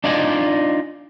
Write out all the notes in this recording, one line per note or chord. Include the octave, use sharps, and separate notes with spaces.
D4 D#4 F4 D5 D#5 G#5